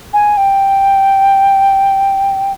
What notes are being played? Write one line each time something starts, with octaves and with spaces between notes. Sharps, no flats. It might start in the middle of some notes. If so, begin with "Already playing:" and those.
G#5
G5